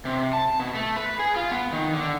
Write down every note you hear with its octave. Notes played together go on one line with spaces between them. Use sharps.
C3
A5
B2
A3
B4
G#4
F4
B3
D#3
D3